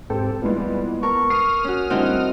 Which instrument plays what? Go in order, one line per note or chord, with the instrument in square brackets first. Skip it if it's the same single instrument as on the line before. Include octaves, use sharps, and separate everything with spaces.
[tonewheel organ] G#2 C4 G4 [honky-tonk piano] A4
[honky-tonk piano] A#2 E3 G#3 [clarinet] G3 [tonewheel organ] B3
[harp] A#4 [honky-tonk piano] A5 [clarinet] C#6
[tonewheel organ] D#6 F6 [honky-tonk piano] C7
[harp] C#4 F#4
[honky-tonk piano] A2 D3 G3 [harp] C4 D#4 E4 [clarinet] F#5